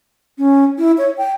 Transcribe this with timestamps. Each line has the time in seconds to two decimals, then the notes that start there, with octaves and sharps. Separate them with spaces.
0.38 C#4
0.78 E4
0.98 C#5
1.18 G5